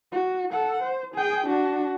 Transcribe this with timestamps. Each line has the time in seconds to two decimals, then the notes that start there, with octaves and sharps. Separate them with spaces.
0.12 F#4
0.51 A4 F#5
0.82 C5
1.15 G#4 G5
1.47 D4 F#4